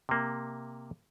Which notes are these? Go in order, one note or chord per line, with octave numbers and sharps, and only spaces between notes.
C3 A#3